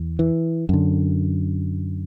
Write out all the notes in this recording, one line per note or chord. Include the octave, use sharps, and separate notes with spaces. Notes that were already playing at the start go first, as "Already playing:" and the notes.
Already playing: E2
E3
F#2 D3